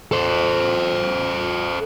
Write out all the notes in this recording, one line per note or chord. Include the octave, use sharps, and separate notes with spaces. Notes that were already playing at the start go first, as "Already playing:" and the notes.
A4 C5